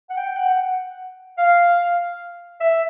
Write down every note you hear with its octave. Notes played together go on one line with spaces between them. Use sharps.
F#5
G5
F#5
F5
E5